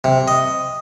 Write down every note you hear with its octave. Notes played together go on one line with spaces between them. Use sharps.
C3
D#5